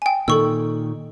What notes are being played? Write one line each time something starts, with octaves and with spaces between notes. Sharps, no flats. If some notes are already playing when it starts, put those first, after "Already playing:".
G5 G#5
A#2 D#3 A4 C#6 E6